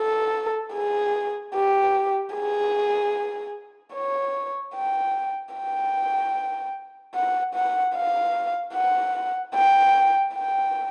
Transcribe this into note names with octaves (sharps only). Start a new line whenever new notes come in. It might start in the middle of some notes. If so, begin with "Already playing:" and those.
Already playing: A4
G#4
G4
G#4
C#5
G5
G5
F#5
F#5
F5
F#5
G5
G5